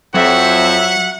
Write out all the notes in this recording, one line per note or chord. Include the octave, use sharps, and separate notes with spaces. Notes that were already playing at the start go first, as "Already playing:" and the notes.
F2 F#3 C4 E5 F#5